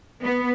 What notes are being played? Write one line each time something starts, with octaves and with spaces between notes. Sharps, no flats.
B3